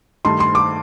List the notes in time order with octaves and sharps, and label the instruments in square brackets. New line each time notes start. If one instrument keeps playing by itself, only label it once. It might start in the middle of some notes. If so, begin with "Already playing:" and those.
[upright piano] G2 D#3 A3 [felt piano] C6
[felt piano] C6
D6